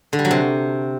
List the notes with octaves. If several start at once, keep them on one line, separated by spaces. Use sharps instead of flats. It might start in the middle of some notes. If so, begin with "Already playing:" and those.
D3
G3
F#3
C3